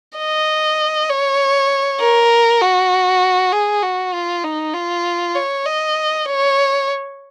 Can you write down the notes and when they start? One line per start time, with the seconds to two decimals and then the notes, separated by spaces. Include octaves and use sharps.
0.18 D#5
1.10 C#5
2.00 A#4
2.61 F#4
3.52 G#4
3.83 F#4
4.14 F4
4.44 D#4
4.74 F4
5.35 C#5
5.65 D#5
6.26 C#5